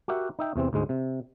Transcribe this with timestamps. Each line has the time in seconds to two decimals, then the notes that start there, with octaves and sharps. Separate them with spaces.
0.08 F#4 G4 A#4 E5 F#5
0.39 D#4 E5 G5
0.56 E2 C3 E3 C4
0.73 D2 G#2 G#3
0.89 C3